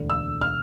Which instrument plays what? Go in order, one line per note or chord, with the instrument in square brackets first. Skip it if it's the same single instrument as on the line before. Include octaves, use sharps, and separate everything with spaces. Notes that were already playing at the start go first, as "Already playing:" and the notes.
Already playing: [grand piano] E1 D2 D3
[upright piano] E6
F6